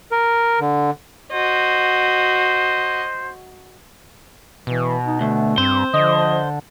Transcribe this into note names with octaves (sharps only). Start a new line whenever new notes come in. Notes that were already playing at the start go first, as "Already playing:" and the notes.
A#4
D3
F#4 C5 D#5
B2 E3
D#4
D2 A3
G2 C4 C5
D3 F3 D#5